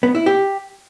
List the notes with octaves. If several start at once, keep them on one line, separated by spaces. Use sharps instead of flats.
B3
E4
G4